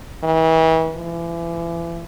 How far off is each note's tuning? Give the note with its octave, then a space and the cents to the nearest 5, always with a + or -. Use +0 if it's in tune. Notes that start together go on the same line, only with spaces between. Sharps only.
E3 -35
E3 +35